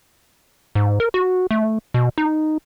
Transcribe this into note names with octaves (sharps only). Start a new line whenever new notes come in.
G#2
A#4
F#4
A3
B2
D#4